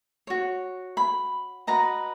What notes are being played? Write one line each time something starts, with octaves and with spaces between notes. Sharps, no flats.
F#4 C#5
B5
F#4 B4 D#5 A#5